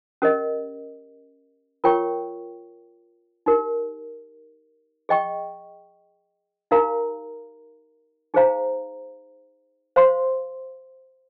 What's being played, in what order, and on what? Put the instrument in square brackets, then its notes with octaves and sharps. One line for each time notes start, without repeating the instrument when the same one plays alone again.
[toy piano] C#4 G4 A#4 D#5
F4 A#4 C#5 G5 C#6
D#4 G4 A#4
G#4 D#5 G5 C#6
D#4 G4 A#4 F5 A#5
D#4 G#4 C5 F5 A#5
C5 F5 C6